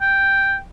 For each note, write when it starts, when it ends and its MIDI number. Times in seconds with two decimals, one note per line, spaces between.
0.01 0.60 79